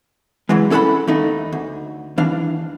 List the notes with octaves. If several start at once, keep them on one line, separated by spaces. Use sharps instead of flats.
C#2 G2 E3 F#3 G#3
C#4 E4 A4 C5 F#5 B5
D#2 A3 D#4
D2
D#2 E3 D4 F5